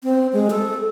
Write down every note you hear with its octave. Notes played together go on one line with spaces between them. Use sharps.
C4
G#3
A4